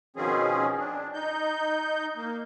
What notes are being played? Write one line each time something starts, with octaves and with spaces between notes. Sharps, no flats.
B2 D#3 F3 C4 C#4 G#4
D4
D#4 G6
A#3